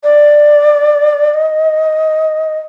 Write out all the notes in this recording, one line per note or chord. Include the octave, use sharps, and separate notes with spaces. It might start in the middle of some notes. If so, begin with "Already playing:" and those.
D5
D#5